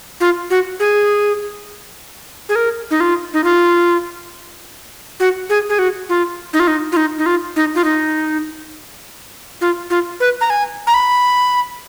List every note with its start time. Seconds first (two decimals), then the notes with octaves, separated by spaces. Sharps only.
0.20 F4
0.50 F#4
0.80 G#4
2.49 G#4
2.56 A#4
2.91 D#4
3.00 F4
3.34 D#4
3.44 F4
5.20 F#4
5.50 G#4
5.69 G#4
5.79 F#4
6.09 F4
6.53 D#4
6.60 F4
6.67 D#4
6.92 F4
6.97 D#4
7.18 D#4
7.26 F4
7.56 D#4
7.75 F4
7.84 D#4
9.61 F4
9.90 F4
10.20 B4
10.41 A#5
10.50 G#5
10.87 A#5
10.94 B5